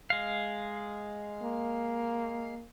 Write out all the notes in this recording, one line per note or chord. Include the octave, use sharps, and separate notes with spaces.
G#3 F5
A#3